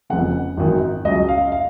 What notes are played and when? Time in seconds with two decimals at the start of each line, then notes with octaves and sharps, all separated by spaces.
0.10 F1 F2 C#3 F#5
0.57 G#1 F#2 D#3
1.05 C#2 C#3 F#3 D#5
1.28 F5
1.52 F5